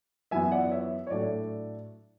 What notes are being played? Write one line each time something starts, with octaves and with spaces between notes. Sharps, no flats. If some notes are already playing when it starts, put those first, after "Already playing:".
F#2 E3 B3 E5 G#5
D5 F#5
C#5 E5
C#5
A2 F#3 A3 D4 D5